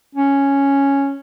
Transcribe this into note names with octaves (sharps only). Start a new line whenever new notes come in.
C#4